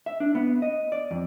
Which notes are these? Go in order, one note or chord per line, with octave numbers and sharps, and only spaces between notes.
E5
D4
B3
D#5
D5
F2